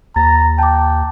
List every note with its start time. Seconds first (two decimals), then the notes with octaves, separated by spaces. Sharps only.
0.16 D#2 A#5 A6
0.59 G5 A5 D6